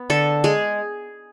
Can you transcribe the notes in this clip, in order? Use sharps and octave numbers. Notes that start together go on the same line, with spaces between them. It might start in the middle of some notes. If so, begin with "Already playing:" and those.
Already playing: B3
D3 A4
G#3 G#4